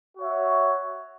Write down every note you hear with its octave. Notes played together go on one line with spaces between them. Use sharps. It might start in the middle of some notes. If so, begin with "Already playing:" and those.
F#4 C#5 E5